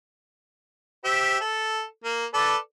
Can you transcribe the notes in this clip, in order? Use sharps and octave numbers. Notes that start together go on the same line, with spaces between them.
G4 C5 E5
A4
A#3
A4 B4 D5